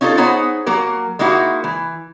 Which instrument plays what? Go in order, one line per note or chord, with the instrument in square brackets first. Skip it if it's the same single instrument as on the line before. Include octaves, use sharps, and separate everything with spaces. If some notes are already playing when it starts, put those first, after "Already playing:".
[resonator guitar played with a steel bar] C#4 D#4 F4 G#4 A4
B3 D#4 G#4 C5 C#5 F#5
F#3 A#3 A#4
G#3 A#3 D#4 E4 F#4
E3